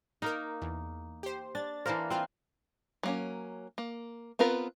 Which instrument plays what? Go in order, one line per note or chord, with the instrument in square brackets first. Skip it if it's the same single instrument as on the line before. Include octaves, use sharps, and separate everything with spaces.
[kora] A#3 D#4 [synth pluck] A#4 F5
[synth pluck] E2
G4 C5
[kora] D4 [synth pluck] A6
[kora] E3 A#3 A#4 [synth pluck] C5 F5 A5
[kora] C4 [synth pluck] F4 F#6 C7
[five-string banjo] F#3 A#3 C#4
A#3
B3 C4 F4 A#4 B4